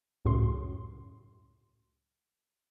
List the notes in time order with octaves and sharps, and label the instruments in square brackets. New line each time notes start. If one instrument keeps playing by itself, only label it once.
[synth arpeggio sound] C#2 F#2 A2 C6